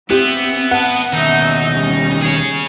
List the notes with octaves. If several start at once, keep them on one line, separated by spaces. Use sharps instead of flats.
B3 C4 G4 E5
B4 F#5 A5
D#2 B2 C#4 D#4 E5
G3 C#4
G#4 C#5